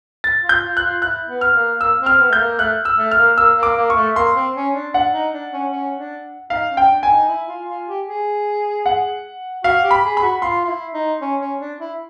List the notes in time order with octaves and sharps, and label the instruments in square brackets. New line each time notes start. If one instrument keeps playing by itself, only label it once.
[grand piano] A6
[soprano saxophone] F4
[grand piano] G6
[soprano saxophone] F4
[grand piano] F#6
[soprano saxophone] F4
[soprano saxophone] E4 [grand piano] F#6
[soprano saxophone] B3
[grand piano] F6
[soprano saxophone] A#3
[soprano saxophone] A#3 [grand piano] E6
[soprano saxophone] C4
[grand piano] F6
[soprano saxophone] B3
[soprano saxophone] A3 [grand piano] G6
[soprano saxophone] A#3
[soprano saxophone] A3 [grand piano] F#6
[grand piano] E6
[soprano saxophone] A3
[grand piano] F6
[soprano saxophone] A#3
[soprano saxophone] A#3 [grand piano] E6
[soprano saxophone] A#3
[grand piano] D6
[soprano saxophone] A#3
[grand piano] C#6
[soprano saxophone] A3
[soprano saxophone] A#3 [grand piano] C6
[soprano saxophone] C4
C#4
D4
[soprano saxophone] D4 [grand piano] F#5
[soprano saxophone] D#4
D4
C#4
C#4
D4
[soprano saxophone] D#4 [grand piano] F5
[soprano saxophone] C#4
[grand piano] G5
[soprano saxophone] D4
[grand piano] G#5
[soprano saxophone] D#4
E4
F4
F4
G4
G#4
[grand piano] F#5
[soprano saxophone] F#4 [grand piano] F5
[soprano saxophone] G4
[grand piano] B5
[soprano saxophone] G#4
[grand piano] B5
[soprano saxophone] F#4
[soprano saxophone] F4 [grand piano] C6
[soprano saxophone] F4
E4
D#4
C#4
C#4
D4
E4